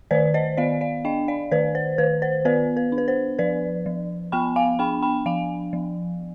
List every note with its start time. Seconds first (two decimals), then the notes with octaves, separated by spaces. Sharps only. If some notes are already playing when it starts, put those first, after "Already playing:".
0.11 D#3 B4 D5
0.34 C5 D#5
0.57 B3 D5 F5
0.81 D5 F5
1.05 D4 D#5 G5
1.28 D5 F5
1.51 D#3 B4 D5
1.75 C5
1.98 D#3 B4
2.22 C5
2.45 B3 B4 D5
2.77 B4
2.92 D4
2.98 B4
3.08 C5
3.39 F3 B4 D5
3.86 F3
4.32 B3 G5 B5
4.56 F5 G#5
4.79 D4 G5 B5
5.02 G5 B5
5.26 F3 F5 G#5
5.73 F3